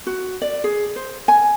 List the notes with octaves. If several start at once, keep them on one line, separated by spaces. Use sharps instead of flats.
F#4
D5
G#4
C5
G#5